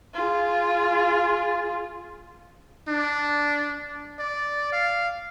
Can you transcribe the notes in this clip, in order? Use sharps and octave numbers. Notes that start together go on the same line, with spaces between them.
F4 G#4
D4
D5
F5